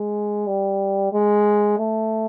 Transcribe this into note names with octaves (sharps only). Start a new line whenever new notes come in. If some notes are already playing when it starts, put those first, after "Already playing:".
Already playing: G#3
G3
G#3
A3